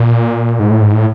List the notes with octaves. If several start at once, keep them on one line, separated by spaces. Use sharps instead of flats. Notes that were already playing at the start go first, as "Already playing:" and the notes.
Already playing: A#2
G#2
A2
G#2
A2